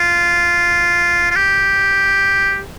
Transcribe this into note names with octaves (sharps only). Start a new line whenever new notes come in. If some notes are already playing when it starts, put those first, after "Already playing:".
Already playing: F4
F4
G4